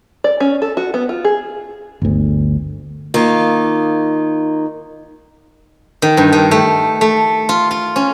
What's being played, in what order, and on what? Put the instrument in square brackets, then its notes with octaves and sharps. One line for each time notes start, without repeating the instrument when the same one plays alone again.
[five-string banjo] D5
C#4
A4
F#4
B3
F4
G#4
[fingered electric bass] G1 D2
[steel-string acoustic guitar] D#3 A#3 D#4 F4
[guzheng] D#3
G2
D#3
A3
A3
F4
F4
C#4